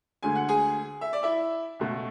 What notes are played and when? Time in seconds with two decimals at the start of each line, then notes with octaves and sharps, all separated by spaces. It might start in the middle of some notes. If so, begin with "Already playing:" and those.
0.23 D2 D3 G#3 G#5
0.35 F#5
0.49 G#4 G#5
1.01 E5
1.13 D5
1.23 E4 E5
1.79 C#2 B2 A3